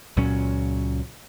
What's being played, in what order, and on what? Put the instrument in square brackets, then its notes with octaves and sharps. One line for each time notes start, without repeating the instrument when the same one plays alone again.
[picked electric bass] C#2 A#2 F#3 C#4